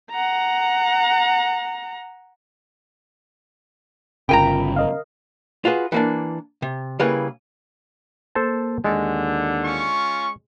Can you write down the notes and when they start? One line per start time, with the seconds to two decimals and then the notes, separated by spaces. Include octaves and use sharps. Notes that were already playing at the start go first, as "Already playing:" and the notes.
0.11 F#5 A#5
4.29 G1 C#3 F4 A#4 G5 G#5 A#5 B5
4.76 A#4 D#5 F5
5.65 F4 F#4 G#4 B4
5.92 E3 A#3 D4
6.62 C3
6.99 C#3 G3 A#3 E4 G#4 B4
8.35 A#3 A4 C5 A5
8.84 D#2 D3 G#3
9.65 C#4 F4 C#6